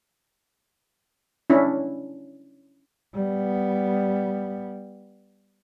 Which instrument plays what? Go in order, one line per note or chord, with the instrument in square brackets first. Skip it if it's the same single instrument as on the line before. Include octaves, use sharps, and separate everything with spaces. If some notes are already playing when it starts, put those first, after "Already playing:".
[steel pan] C#4 D4 E4
[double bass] G3 B3